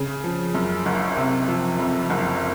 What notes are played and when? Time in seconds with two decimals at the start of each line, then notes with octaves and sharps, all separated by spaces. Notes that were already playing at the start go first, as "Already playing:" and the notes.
Already playing: C#3
0.24 F3
0.55 F#2
0.86 F#1
1.17 C3
1.48 F3
1.79 F2
2.10 F#1